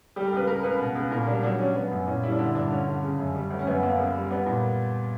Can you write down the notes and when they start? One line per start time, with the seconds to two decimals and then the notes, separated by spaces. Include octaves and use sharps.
0.16 G3 G4
0.27 A#4
0.32 C#2 B4
0.47 C#2 A#4
0.63 C#2 B4
0.80 B2
0.95 C#2
1.11 A#2 A#4
1.27 G3 D4
1.43 F#3 D4
1.59 F#3 C#4
1.75 F#3 B3
1.91 F#2
2.07 A#2 C#4
2.23 G3 E4
2.32 D4
2.38 D3 E4
2.55 G2 D4
2.71 D3 C#4
2.87 D3
3.03 C#3
3.19 F#2
3.34 G3
3.50 D2
3.59 C#4
3.67 F#2 B3
3.83 F#2 A#3
3.98 C#2
4.15 G3
4.30 G3 B3
4.46 A#2